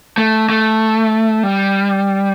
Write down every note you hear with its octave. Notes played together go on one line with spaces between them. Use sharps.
A3
A3
G3